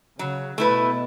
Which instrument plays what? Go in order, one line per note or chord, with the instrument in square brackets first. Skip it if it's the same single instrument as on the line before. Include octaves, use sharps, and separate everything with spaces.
[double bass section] C#3 [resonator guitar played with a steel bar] F#3
[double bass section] B2 [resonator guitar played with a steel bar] A3 E4 B4